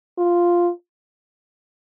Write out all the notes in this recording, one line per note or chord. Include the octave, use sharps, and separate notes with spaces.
F4